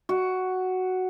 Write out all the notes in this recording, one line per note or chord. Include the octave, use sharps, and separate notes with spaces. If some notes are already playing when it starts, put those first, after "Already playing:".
F#4